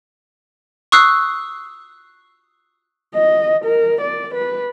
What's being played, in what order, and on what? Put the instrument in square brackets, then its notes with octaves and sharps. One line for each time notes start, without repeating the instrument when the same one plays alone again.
[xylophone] C#6 D#6 E6 F#6 C7
[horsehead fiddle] D#5
A#4
D5
B4